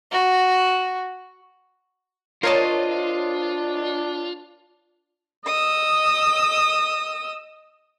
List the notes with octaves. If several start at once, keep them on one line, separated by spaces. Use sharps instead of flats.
F#4
D4 F4 A#4 C5 C#5 D#5 A5
D#5 D#6 E6